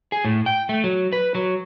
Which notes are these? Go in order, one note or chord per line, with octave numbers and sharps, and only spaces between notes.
G#4
A2
G5
A3
F#3
B4
F#3